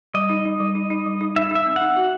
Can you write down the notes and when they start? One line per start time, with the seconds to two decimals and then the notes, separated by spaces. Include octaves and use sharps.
0.14 G3 D#5
0.29 D#4
0.45 D#4
0.60 G3
0.75 D#4
0.90 D#4
1.06 G3
1.21 D#4
1.36 D#4 E5
1.51 D#4 E5
1.66 C4
1.76 D#4 F#5
1.97 F#4